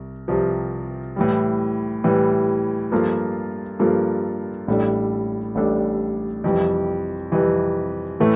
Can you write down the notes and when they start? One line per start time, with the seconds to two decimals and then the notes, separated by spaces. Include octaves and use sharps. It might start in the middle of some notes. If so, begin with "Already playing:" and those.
Already playing: C2
0.28 C2 C3 F3
1.16 A2 E3 G3
2.04 A2 E3 G3
2.92 G2 F3 A#3 F4 A4
3.79 G2 F3 A#3 F4 A4
4.68 A1 A2 G3 D4 A4
5.55 A1 A2 G3 D4 A4
6.44 F2 C3 E3 G3
7.32 F2 C3 E3 G3
8.20 A2 E3 A3